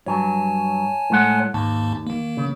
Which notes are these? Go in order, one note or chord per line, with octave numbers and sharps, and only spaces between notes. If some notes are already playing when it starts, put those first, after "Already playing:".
G2 F#3 C#5 G#5 A5
A2 G#3 F#5
D#2 G#2 A#3 A5
D#3 A#3
C#3